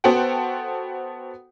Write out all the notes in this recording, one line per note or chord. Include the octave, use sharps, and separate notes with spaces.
B3 F#4 A4 C5 F#5 G5